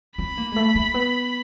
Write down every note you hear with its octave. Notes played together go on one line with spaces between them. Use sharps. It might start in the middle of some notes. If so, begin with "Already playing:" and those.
C4 B5
A#3
G#3
A3
A#3
B3